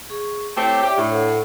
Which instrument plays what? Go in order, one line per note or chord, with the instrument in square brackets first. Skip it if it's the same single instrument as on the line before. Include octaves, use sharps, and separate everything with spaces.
[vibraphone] G#4 C#6
[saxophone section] A3 C4 G4 [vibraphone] E4 C#5
[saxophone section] G4 [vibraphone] D5 E5 G5
[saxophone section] A2 [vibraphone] D4 C#5
[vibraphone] A4 C5 F#5